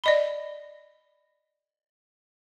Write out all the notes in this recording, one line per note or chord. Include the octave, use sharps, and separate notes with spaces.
D5 D#5 B5